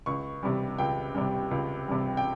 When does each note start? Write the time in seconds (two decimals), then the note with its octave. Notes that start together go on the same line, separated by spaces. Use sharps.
0.06 C#2 C#6
0.43 C3 G3
0.78 C#2 G5
1.15 C3 G3
1.51 C#2
1.88 C3 G3
2.17 G5